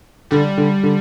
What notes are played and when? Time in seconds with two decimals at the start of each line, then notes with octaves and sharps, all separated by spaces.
0.31 D3 G3
0.58 D3
0.83 D3